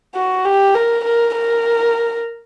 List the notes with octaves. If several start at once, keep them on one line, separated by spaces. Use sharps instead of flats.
F#4
G4
A#4
A#4
A#4